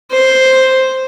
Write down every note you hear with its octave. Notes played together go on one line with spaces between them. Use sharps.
C5